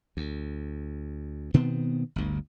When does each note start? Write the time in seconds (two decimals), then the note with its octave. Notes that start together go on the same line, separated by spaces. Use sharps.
0.17 D2
1.54 B2 D#3 B3 C4
2.16 G1 D2